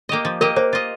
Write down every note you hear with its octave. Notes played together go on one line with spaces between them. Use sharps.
A#3 G4 D#5
F3
A#3 G4 A#4 D#5
A#3 C5
F4 D#5